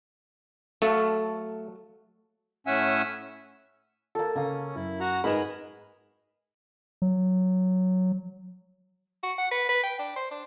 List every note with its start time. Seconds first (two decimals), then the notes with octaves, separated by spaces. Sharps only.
0.82 F#3 A3 A4 F5
2.67 A2 C#4 E5 F#5 G#5 E6
4.15 A#3 A4
4.35 C#3 A#3 C#4 F5 A#5 D#6
4.75 F#2 E4
5.00 F#4 F#5 A#5
5.24 G#2 D#4 G#4 A#4 B4 B5 E7
7.02 F#3
9.23 F#4
9.38 F#5
9.51 B4
9.69 B4
9.83 G5
9.99 D4
10.16 C5
10.31 D4